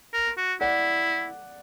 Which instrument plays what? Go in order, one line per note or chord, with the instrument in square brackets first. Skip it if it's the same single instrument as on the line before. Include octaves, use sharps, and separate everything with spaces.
[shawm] A#4
F#4
[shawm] E4 [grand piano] D5 F#5